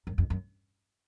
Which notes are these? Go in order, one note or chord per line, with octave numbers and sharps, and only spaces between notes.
F#2
F2
F#2